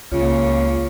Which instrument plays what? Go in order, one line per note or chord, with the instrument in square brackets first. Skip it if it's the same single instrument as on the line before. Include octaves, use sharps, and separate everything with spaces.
[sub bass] C#2 [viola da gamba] C#3 A#3 [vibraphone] F4 C#5